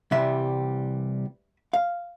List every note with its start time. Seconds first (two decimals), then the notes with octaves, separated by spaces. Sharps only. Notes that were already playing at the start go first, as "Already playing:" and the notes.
0.11 C2 C3 E3 G3 E5
1.73 F5